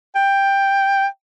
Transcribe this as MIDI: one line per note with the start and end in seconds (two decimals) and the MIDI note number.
0.15 1.07 79